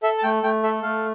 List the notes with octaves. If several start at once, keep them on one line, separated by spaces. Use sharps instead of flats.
A4 E5
A5
A3 G5
A3 G5
A4 E5
A3 F5